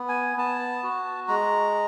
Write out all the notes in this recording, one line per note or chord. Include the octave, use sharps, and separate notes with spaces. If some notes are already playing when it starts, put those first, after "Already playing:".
Already playing: B3
G#5
B3 A5
F#4
G#3 A#5